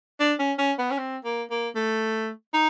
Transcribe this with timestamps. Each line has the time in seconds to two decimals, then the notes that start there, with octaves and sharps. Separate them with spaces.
0.20 D4
0.39 C#4
0.58 C#4
0.78 B3
0.91 C#4
0.98 C4
1.24 A#3
1.50 A#3
1.75 A3
2.53 D#4